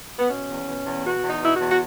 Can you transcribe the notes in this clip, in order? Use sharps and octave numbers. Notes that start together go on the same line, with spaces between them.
B3
B2 C#4
E2
B2
E2
B2 F#4
E2
D#4
B2 E4
F#4
E2
F#4